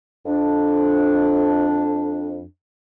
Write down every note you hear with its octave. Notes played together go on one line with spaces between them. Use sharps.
F2 D4